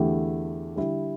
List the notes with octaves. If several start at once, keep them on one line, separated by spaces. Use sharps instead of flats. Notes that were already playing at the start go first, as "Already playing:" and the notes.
Already playing: E2 D3 A3 E4 G4
D3 G3 E4